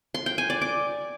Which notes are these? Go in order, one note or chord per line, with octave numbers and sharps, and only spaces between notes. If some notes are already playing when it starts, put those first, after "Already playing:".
C6
G5
G#5
D5
D6